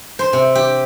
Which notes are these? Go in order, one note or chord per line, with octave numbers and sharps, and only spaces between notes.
C5
C3
G4